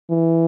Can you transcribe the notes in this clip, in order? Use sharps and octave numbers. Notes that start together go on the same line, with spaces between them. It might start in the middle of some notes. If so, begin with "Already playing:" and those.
E3